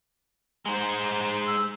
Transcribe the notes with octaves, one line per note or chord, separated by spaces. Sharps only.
G#3 C5 A#5
E6